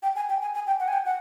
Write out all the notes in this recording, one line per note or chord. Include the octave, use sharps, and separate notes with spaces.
G5
G#5
G5
G#5
G#5
G5
F#5
G#5
G5
F#5